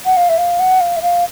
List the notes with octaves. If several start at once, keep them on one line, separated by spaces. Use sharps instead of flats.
F#5
F5
E5
F5
F#5
F5
E5
F5